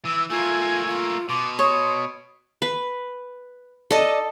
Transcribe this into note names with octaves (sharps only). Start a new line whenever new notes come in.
E3 E6
A3 A#3 F4 G#5
F4
B2 C6 D6
C#5 D#6
B4
D4 D#4 A4 D#5